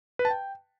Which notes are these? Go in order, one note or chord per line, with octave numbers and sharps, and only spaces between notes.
B4
A5
G5